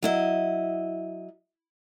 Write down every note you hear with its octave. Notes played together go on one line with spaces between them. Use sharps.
F#3 E4 D#5